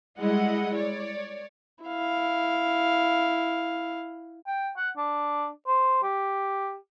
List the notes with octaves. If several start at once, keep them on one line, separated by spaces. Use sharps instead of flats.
G3 G#3 E4 D#5 F#5
C#5 D5
E4 F5
G5
F#5
D4
C5
G4